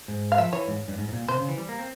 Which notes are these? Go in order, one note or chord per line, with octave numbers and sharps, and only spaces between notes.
G#2
F5
F3 E5
E3 C#5
G#2
G2
G#2
G#2
A#2
C3 C5
C#3
E3
G3
A#3
C4